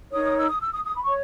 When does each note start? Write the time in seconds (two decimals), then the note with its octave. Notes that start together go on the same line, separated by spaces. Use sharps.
0.12 D#4 A#4 C#5 D#6
0.24 D#6
0.36 E6
0.47 D#6
0.60 E6
0.71 D#6
0.84 D#6
0.95 B5
1.03 C#6
1.08 C#5